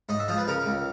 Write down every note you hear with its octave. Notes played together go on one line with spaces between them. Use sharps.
G#2 D#5
E5
F3 D#5
B4
C#3 A#4
C#2